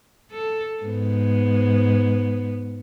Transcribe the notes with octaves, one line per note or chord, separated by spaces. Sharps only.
A4
G#2 B3